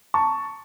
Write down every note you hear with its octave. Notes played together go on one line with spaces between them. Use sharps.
A5 C#6